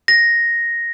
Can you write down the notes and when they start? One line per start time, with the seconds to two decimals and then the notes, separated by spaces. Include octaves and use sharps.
0.08 A#6